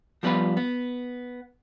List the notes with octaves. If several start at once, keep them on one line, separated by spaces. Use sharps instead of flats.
F3 G3 B3 F4 B4
B3